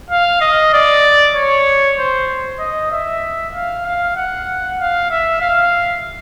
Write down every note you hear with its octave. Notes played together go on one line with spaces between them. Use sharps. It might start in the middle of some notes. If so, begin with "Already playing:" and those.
F5
D#5
D5
C#5
C5
D#5
E5
F5
F5
F#5
F5
E5
F5